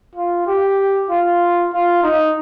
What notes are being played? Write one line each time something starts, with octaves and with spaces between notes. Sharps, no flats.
F4
G4
F4
F4
D#4